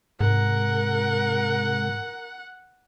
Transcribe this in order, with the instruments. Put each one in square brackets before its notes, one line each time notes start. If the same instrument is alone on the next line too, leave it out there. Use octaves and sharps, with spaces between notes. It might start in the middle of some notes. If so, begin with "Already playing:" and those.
[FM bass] G#2 [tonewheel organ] C3 G#3 [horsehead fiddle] A#4 [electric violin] F#5